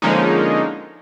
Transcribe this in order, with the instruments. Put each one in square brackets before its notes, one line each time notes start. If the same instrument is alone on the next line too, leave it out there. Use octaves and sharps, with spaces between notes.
[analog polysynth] D3 F3 G#3 A#3 C#4 D#4